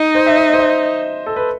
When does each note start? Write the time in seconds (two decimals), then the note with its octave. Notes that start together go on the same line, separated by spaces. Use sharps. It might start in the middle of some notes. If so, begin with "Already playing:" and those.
Already playing: D#4 D#5
0.15 C5
0.26 E5
0.37 D#5
0.53 C5
0.59 D#5
1.26 A4
1.36 B4